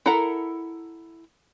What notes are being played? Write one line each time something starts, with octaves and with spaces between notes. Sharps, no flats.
E4 A4 A#4 F#5 A#5